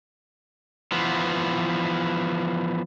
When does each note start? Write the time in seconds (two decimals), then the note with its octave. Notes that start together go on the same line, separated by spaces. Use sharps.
0.92 E3 F3 B3